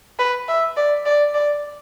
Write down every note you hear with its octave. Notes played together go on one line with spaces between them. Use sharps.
B4
E5
D5
D5
D5